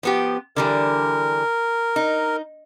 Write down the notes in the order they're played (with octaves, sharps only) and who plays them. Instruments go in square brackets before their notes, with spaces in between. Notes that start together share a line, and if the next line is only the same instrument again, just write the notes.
[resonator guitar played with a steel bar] F3 B3 G4
[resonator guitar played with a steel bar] D3 E3 G3 [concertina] A#4
[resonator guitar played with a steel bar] D#4